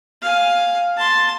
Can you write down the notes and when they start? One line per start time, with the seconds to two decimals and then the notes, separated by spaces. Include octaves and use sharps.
0.22 F5 G#5
0.97 A5 C6